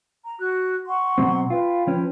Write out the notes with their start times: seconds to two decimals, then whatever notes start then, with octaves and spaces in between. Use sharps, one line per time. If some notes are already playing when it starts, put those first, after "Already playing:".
0.24 A#5
0.41 F#4 F#6
0.86 F#5 C6 C#6
1.18 B2 F#3 C4
1.50 F4 B4 G5
1.87 F3 C#4